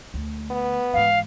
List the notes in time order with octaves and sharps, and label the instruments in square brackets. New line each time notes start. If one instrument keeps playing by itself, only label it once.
[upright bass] D2
[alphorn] B3
[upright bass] G#2 E3 [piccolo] F5